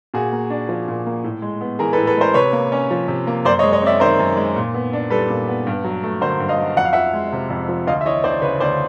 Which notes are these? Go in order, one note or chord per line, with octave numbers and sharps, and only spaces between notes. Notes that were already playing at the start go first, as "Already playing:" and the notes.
A#2 F#4 G#4
A#3
D4
F3
A#2
A#3
A2
G#3
B3
E3 G#4 A#4
A4 B4
A2
A4 B4
G#3 A#4 C5
C3 B4 C#5
A#3
C#4
F3
C3
A#3
F#2 C5 D5
C#5 D#5
G#3
C#5 D#5
C4 D5 E5
D#3 A#4 C5
F#2
G#3
A#2
B3
D4
G3 A4 B4
A#2
B3
G2
F#3
A3
D3 A#4 C5
G2
D#5 F5
F#3
F2 F#5
F5
F3 E5 F#5
G#3
C3
F2
F3
D2 D#5 F5
E5
E3 C#5 D#5
D2 C5 D5
C#3 B4 C#5
D2 C5 D5